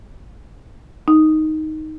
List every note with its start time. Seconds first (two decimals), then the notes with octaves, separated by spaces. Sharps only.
1.08 D#4